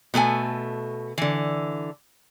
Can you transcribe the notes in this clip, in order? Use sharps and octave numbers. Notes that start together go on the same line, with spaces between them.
B2 A3 A4 G#5
D3 E3